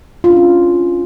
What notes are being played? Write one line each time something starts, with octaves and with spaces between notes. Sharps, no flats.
F4
D4
C#4